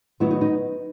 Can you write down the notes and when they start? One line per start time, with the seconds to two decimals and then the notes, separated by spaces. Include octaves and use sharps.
0.20 D#3 F#3 B3 E4
0.31 D#4
0.41 D#4